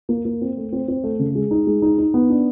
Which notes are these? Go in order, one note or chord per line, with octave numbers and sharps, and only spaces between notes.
A#3
A#3
C4
A3
C4
C4
A3
C#3
G#3
D#4
G#3
D#4
D#4
B3
D4